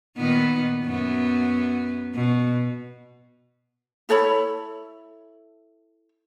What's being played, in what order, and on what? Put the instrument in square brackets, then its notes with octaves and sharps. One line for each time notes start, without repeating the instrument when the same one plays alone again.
[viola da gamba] A#2 D#3 B3
F#2 B3
B2
[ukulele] E4 A4 C#5 B5